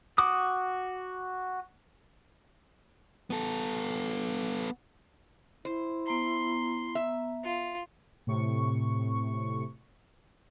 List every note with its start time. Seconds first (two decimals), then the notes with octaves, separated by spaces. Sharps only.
0.18 F#4 D6 D#6
3.30 B3 A4
5.65 E4 C5
6.07 B3 A#5 C6
6.95 E5
7.45 F4
8.27 A2 C3 C#6